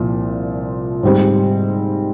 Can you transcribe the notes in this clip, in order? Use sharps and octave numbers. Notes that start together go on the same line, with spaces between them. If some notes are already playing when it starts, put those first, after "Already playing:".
Already playing: C2 A#2 F3
G#2 G3 C4